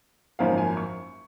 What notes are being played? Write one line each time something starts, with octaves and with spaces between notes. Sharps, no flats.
G#1 F#2 F3 A#3 C#4 F5
G#5
C#6